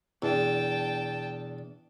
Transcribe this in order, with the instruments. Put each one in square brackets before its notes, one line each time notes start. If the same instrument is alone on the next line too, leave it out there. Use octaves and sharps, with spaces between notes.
[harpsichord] E2 [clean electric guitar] B2 D4 [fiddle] G5 A5